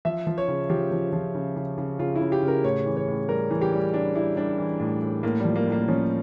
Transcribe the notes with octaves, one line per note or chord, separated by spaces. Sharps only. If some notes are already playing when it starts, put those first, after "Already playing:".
F3 E5
F3
C#5
C#3
F3 G4
F3
F3
C#3
C#3
C#3
C#3 F4
E4
C#3
G4
C#3
A#4
A2 C#5
E3
C#5
A2
G3 A#4
E3
G4
G3
G3 D4
G3 E4
G3 D4
E3
A2
A2
A2 A#3
F3 G3
A#3
A2
A#3
F3 C#4